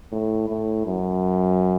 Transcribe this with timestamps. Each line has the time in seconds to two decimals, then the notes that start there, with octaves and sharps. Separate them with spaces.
0.12 A2
0.49 A2
0.86 F#2